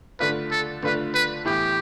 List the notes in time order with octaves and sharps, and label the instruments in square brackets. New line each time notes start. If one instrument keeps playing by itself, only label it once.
[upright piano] D3 A3 D4 F4 [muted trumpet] B4
[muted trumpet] A4
[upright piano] D3 A3 D4 F4 [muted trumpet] B4
[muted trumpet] B4
[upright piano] A2 E3 B3 E4 [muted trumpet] G4